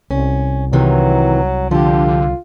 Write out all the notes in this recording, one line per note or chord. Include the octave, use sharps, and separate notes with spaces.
C2 C#4
C3 D#3 E3 F#3
D3 F3 F4 G4